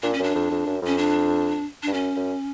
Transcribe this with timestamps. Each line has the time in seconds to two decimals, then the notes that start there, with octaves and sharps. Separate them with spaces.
0.03 A#2 D4
0.13 C#4
0.19 F#2 D4
0.35 F2
0.51 F2
0.66 F#2
0.82 F2 C#4
0.98 D4
1.83 G2 D4
1.93 F#2 C#4
2.17 F#2